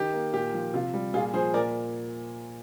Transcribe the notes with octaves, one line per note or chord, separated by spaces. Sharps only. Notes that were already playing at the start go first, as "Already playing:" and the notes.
Already playing: D#3 G4
A#3
A#2 G4
F3
C3 F4
G3
A#2 F4 G#4
F3 G#4 C5
A#2 A#4 D5